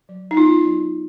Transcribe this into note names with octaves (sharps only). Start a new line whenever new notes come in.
F#3
D#4
B3 F4
F#3